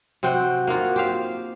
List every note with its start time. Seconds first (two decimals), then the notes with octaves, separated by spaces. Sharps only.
0.23 C3 C4 F#4 G5
0.67 A#3 D#4 F4 F#4
0.96 G4 C5 F5